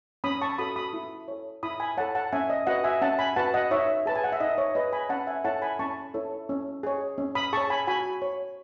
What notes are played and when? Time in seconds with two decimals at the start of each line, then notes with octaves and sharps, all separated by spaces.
0.24 C#4 B5 D#6
0.41 A5 C#6
0.58 F#4 A4 B5 D#6
0.76 B5 D#6
0.93 E4
1.28 A4 C#5
1.63 E4 B5 D#6
1.80 G#5 B5
1.97 A4 C#5 F#5 A5
2.15 F#5 A5
2.32 C#4 E5 G#5
2.50 D#5
2.67 F#4 B4 D#5 F#5
2.84 E5 G#5
3.01 C#4 F#5 A5
3.19 G#5 B5
3.36 F#4 B4 F#5 A5
3.54 D#5 F#5
3.71 D#4 C#5 E5
4.06 G#4 B4 A5
4.15 G#5
4.24 F#5
4.32 E5
4.41 D#4 D#5
4.58 C#5
4.75 G#4 B4 D#5
4.92 G#5 B5
5.09 C#4 F#5 A5
5.27 E5 G#5
5.44 E4 A4 C#5 F#5 A5
5.62 G#5 B5
5.79 C#4 A5 C#6
6.14 E4 A4 C#5
6.49 C#4
6.83 G#4 C#5
7.18 C#4
7.35 B5 D#6
7.53 G#4 C#5 A5 C#6
7.70 G#5 B5
7.87 F#4 G#5 B5
8.22 C#5